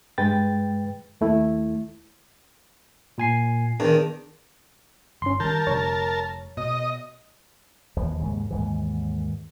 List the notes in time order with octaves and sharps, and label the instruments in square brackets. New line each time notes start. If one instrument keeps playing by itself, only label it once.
[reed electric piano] G2 G#3 B4 G5 A6
D#2 A3 E4
[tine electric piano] A#2 G#5 C7
[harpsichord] E2 D#3 [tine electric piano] D4
[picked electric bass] G1 [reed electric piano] C#4 C6
[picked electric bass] D#3 G3 [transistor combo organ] A#4 A5 [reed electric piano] G6
[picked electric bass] F1 D3 G3 [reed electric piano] C#5
[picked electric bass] B2 [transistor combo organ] D#5
[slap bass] D#2 E3 F3
D#2 G#2 C#3
D#2 G#2 E3